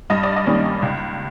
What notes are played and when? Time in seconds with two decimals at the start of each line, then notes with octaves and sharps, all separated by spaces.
0.10 G2 D#5
0.23 D5
0.36 D#5
0.46 D#3 G3 A#3 C#4
0.82 C#2